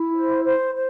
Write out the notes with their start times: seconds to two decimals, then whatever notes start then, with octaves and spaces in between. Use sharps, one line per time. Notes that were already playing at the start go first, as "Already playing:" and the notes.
Already playing: E4
0.14 C5
0.44 C5
0.74 C5